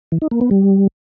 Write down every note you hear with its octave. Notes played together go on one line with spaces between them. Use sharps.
E3
D#4
A#3
B3
G3